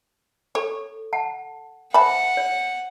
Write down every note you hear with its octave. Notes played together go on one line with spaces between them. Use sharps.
A4 C#5
F#5 A5
C5 E5 F#5 A5 B5
C#5